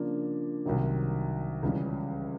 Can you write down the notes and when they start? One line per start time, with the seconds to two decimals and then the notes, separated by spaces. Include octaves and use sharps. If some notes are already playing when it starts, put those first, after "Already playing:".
Already playing: C#3 F3 A#3 D4
0.65 C2 C3 D#3 F#3
1.63 C#2 C#3 E3 G3